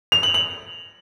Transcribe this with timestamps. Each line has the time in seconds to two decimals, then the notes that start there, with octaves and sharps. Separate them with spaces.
0.12 F7
0.23 F#7
0.34 F#7